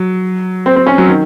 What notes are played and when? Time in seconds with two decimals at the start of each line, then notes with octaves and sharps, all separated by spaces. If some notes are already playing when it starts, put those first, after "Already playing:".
Already playing: F#3
0.66 C4
0.76 C4
0.87 C#4
0.98 F#3
1.08 D#3